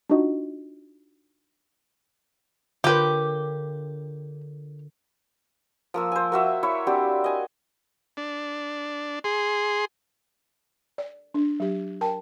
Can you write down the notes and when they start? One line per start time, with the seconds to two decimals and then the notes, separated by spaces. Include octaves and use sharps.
0.10 D4 D#4 F4 F#4 D#5
2.84 D3 F4 G4 A#4 B4 C#5 G5
5.94 F3 A#3 E6
6.12 C5 G#5
6.32 A#3 F#4 E5
6.63 E4 C#5 E5 C#6
6.87 C4 D4 F#4 G4
7.24 D#5 G#5
8.17 D4
9.24 G#4 C6
10.98 D5
11.34 D4
11.60 F#3 G4
12.01 A#4 G5 A5